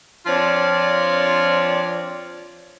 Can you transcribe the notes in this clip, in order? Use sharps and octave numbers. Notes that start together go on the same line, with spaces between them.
F3 C4 D4 F4 C#5 D5